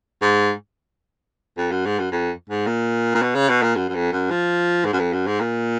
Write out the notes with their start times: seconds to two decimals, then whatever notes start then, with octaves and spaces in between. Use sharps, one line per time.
0.22 G#2
1.58 F2
1.71 F#2
1.86 G#2
1.99 F#2
2.12 F2
2.49 G#2
2.67 A#2
3.15 A#2
3.22 B2
3.35 C#3
3.49 B2
3.62 A#2
3.76 F#2
3.89 F#2
3.95 F2
4.12 F#2
4.31 F3
4.85 G#2
4.93 F#2
4.99 F2
5.13 F#2
5.27 G#2
5.40 A#2